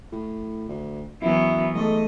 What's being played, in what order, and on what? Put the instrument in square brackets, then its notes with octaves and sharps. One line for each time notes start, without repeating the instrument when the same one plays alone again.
[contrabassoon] A2
D2
[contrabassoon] F#2 [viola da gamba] E3 F#3 B3 [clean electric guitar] E4
[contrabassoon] G#2 [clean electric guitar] A3 A4 [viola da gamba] D#5